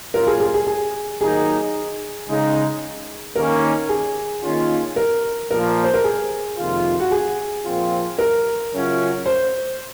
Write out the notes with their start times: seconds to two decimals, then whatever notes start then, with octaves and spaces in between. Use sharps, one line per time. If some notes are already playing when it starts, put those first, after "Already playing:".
0.14 A#2 F#3 C#4 F4 A#4
0.27 G#4
0.40 G#4
0.54 G#4
0.67 G#4
1.21 D#3 F#3 A#3 D#4 G#4
2.28 C#3 G#3 D#4
3.35 D#3 A#3 C#4 A#4
3.89 G#4
4.43 D#3 A#3 C#4 F4
4.96 A#4
5.50 A#2 F3 A#3 A#4
5.84 C5
5.94 A#4
6.04 G#4
6.57 F2 C3 D#3 A#3 F4
7.00 F#4
7.11 G#4
7.65 A#2 F3 C4 F4
8.18 A#4
8.72 F#2 C#3 F#3 C#4 F4
9.26 C5